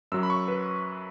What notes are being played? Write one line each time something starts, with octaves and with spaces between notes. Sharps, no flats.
F#2 F#3 E6
B5
C#6
B4